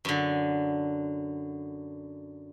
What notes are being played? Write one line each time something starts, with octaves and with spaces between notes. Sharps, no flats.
F#2 D3